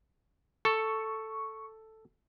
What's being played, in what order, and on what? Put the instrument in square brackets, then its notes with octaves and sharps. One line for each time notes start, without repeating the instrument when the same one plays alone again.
[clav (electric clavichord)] A4 [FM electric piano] C#6